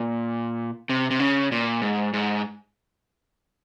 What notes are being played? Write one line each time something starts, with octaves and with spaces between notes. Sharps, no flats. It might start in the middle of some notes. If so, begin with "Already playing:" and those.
Already playing: A#2
C3
C3
C#3
A#2
G#2
G#2